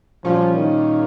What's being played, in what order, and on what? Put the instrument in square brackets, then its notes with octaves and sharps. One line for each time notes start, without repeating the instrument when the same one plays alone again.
[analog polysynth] A#2 G3 C#4 F4 [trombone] F3
[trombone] D#3